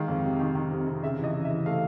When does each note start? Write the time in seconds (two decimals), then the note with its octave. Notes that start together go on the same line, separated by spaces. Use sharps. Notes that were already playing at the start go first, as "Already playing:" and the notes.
Already playing: D#3 G#3 F5
0.08 F2
0.24 C3
0.40 D#3
0.55 D#3
0.71 C3
0.87 C3
1.03 C#3 E5
1.19 E3 D#5
1.35 C#3
1.45 E5
1.51 E3
1.66 A3 F5